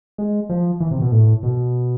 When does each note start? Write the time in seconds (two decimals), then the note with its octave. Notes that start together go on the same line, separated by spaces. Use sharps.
0.18 G#3
0.50 F3
0.80 E3
0.91 C3
1.01 B2
1.12 A2
1.43 B2